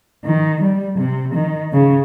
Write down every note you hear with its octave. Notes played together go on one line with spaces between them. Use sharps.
D#3
G3
C3
D#3
C#3